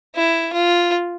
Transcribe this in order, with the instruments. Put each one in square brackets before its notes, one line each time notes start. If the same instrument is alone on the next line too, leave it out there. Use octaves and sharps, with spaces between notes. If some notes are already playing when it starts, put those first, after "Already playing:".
[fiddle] E4
F4